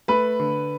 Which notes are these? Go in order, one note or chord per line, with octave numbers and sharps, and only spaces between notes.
A3 B4 B5
D3